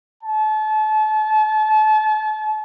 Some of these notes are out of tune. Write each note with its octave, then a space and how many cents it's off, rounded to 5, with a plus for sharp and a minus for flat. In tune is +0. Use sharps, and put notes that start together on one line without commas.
A5 -35